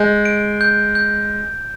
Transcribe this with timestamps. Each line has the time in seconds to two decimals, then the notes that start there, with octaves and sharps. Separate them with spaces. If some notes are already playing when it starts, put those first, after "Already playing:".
Already playing: G#3 G6
0.25 D7
0.61 G6
0.95 G6